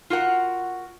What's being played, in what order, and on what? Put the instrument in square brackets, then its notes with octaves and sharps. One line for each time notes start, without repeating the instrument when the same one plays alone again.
[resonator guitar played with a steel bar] F4 F#4 A#4 F#5